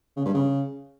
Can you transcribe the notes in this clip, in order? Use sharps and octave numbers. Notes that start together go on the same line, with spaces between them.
C#3
G2
C#3